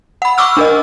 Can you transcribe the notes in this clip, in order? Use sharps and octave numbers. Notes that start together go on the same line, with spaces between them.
F#5 B5
C#6 D6 E6 F6
D4 A#4 D#5